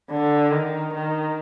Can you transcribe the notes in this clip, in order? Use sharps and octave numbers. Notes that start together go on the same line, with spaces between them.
D3
D#3
D#3